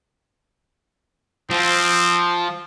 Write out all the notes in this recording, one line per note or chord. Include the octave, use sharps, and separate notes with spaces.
F3 C4